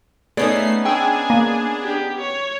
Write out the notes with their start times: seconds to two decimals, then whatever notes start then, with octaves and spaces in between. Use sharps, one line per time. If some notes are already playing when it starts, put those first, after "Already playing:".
0.37 A3 B3 C#4 D#4 G#4 D5 C7
0.85 D4 G#4 G5 G#5 C#6 E6
1.30 A#3
1.84 G4
2.20 C#5